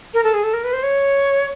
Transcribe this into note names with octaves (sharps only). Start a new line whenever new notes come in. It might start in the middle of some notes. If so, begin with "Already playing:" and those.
A#4
A4
G#4
A4
A#4
B4
C5
C#5